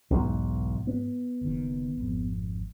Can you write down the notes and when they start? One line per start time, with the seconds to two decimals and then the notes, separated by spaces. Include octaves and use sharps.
0.11 B1 E2 G#2
0.87 B3
1.41 F#1 D#3
1.97 G#1 F2